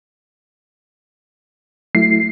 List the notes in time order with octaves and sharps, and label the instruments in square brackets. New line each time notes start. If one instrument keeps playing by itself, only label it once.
[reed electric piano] F#3 A3 E4 [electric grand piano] C7